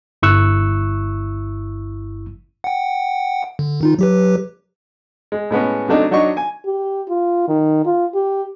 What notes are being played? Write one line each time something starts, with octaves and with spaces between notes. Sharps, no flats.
G1 E4 C#6 E6 F#6
F#5 G5
D3
D#3 D#4 F4
F#3 G4 B4
G#3
A2 G#3 B3 C#4
C3 F#3 A3 D4 D#4
F#3 D4 D#4 D#5 C#6
G#5
G4
F4
D#3
F4
G4